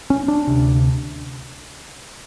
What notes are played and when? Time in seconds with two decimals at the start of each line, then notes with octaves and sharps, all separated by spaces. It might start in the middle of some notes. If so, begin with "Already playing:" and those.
0.10 C#4
0.28 D4
0.47 D2 C3